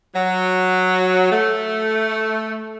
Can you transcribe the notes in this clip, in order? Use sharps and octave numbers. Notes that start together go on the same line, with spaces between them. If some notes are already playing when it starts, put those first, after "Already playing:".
F#3
A3